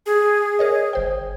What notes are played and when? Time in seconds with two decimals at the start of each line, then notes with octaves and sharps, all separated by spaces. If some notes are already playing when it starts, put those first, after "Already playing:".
0.06 G#4
0.59 A#4 C#5 D#5
0.93 G1 C5 G5